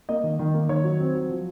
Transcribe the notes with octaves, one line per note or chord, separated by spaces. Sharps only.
A#3 D#5
D#3
D#3
A#3
D#3 C#5
F#3
C4
F#3
F3